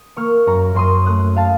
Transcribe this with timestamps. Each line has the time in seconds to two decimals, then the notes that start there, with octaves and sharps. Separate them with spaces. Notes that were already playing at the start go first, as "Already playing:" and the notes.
Already playing: D#6
0.17 A#3 C#6 F6
0.46 F#2 A#5 C#6
0.74 F#2 C6 D#6
1.06 A3 D#6 F#6
1.36 F5 A5